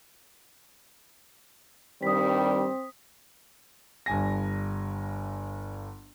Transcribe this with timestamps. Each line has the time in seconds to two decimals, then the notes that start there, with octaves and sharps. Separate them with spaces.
2.03 G2 D#3 G3 C4 D#6 B6
4.06 G1 G2 G#5 A#6